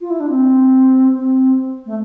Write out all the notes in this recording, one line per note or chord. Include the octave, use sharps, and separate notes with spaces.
F4
E4
D4
C4
C4
A3